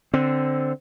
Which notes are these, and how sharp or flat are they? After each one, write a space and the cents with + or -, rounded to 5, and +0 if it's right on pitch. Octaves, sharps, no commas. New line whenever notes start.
D3 +0 C4 +0